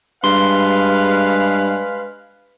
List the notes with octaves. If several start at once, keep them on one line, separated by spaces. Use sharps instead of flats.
G2 G#3 B4 F5 C6